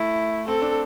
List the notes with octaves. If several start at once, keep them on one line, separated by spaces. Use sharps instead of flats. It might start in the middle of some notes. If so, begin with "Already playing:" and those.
Already playing: A3 E4
C4 A4
D4